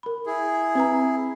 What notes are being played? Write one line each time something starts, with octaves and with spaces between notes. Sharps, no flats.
A#4 B5
E4 G#4
C4 B4 A#5